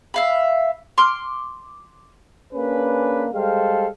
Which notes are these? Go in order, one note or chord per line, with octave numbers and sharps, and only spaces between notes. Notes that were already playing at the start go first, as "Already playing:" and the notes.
E5 F5 B5
C6 D6 F6
A#3 C#4 D4 G#4 B4
G3 G#3 A4 C5 F5